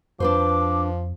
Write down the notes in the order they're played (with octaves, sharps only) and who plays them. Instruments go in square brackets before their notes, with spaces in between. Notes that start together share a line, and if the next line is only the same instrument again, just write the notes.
[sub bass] F2 [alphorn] F3 [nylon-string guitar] D4 B4 C5 [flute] D6